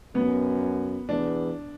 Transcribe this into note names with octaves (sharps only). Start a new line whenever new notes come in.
F#2 B3
E2 D4